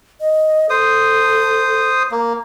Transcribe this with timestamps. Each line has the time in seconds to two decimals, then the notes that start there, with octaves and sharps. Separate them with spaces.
0.20 D#5
0.70 A4 C5 D#6
2.11 A#3